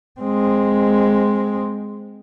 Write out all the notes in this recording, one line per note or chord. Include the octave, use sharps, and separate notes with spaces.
G#3 C4